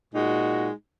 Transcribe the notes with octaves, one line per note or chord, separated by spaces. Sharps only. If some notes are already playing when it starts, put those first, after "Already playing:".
A#2 G#3 D#4 F#4